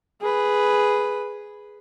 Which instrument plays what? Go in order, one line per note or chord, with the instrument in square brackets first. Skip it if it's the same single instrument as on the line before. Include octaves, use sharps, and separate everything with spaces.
[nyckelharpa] G#4 B4